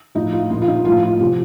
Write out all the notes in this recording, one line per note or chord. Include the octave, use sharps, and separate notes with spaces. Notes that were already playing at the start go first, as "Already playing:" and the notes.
A2 F3 D#4
F4
A#2 F3 F4
F4
D#4
A2 F3 F4
F4
C3 F3 G4